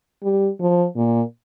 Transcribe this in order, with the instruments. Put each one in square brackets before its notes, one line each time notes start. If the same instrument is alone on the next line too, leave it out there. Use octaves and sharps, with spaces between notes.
[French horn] G3
F3
A#2